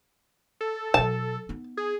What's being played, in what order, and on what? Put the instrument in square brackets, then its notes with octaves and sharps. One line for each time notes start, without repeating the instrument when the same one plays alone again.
[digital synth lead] A4
[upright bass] B2 F#3 [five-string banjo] A5
[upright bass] B3 D#4
[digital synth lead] G#4